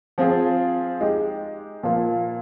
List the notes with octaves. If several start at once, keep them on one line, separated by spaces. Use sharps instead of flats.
F3 C4 F4 G#4
G#3 D#4 G4
A#2 F3 A#3 F4